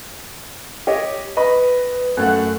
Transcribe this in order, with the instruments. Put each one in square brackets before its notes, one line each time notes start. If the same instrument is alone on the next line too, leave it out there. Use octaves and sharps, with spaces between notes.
[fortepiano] G4 C#5 D#5
[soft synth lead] B4 [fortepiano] D#5 B5
[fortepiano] F#2 A3 F#5 [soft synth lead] F#6